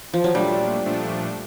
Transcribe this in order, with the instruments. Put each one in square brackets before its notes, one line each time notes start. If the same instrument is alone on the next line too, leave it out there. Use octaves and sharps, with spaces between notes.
[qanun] F3
F#3
[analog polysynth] A#2 F3 A3 D4 [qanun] G3
[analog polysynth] A#2 F3 A3 D4